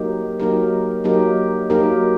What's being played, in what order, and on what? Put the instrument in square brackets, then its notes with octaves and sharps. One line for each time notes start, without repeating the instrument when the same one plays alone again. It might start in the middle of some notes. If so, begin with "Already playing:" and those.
Already playing: [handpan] F#3 A#3 D#4 G4 A#4
F#3 A#3 D#4 G4 A#4
F#3 A#3 D#4 G4 A#4
F#3 A#3 D#4 G4 A#4